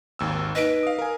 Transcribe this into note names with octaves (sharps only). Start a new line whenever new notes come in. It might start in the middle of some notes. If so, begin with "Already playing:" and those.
G#1 D#2 E6
D#4 B4 D#5 A#6 B6 D7
F5 D#6
A#4 G#5